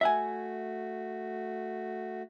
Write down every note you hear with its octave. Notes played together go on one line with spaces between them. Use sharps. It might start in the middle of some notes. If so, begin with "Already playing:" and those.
A3 F#4 E5 F#5 G#5